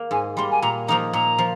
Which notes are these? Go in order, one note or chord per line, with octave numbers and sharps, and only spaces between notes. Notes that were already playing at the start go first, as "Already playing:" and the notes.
Already playing: A#3
G#2 G#5
G3 A#3 C6
G#5
A#2 A#5
F3 A#3 D#4 A#5
A#2 A#5
F3